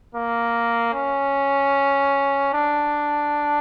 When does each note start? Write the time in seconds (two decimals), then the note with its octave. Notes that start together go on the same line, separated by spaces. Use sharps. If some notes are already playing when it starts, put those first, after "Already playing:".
0.15 A#3
0.94 C#4
2.53 D4